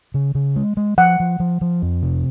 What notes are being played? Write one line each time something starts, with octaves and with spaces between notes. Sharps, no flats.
C#3
C#3
G#3
G#3
F3 F#5
F3
F3
F3
F2
C3